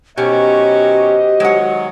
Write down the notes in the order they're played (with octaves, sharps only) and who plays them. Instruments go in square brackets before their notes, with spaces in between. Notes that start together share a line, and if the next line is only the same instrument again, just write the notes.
[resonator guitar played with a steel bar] B2 [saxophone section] D#3 F#3 C#4 [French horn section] F#4 C5 D#5 [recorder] G4
[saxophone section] D#3 F#3 [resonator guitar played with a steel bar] G#3 F#5